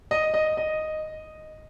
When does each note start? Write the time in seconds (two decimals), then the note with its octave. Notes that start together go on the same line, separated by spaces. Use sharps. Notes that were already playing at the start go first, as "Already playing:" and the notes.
0.11 D#5
0.34 D#5
0.57 D#5